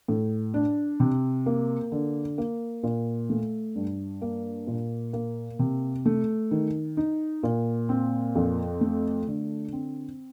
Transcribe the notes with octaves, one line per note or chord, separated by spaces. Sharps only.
A2
D4
C3
A#3
D3
A#3
A#2
A3
G2
A#3
A#2
A#3
C3
A3
D#3
D#4
A#2
C4
F2
A3
D3
C4